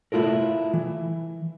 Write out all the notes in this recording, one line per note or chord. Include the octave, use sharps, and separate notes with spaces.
A3 E4 F4 A4 A#4
E3